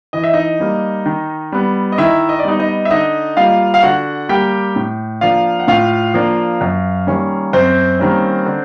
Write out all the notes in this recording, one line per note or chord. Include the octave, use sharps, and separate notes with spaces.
E3 D#5
E5
D#4 D#5
G3 A#3
D#3
G3 B3
D#5
D#3 E4 E5
D#5
D5
G3 B3 D#4 D#5
D#4 D#5
E5
D3 D#4 D#5
G3 A#3 F4 F5
F5
D3 F#4 F#5
G3 A#3 G4 G5
A2
F3 A#3 D4 F4 F5
F#5
A2 F4 F5
F3 A#3 D4 F4
F#2
D#3 G3 A#3 C#4
F#2 C4 C5
D#3 G3 A#3 C#4
D3